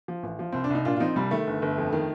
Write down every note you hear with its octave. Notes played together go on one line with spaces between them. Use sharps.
F3
A1
F3
C2 C4
D4
C2 D#4
A#2 D4 F4
F4
F3 C4 D#4
C2 G3
D#3 A3
G1
G1
F2
D#3